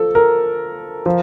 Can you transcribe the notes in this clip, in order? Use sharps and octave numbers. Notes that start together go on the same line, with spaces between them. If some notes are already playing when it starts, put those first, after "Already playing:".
Already playing: F3 A4
A#4
F3